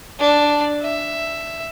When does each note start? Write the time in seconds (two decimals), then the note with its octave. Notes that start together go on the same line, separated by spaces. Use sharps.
0.19 D4
0.81 E5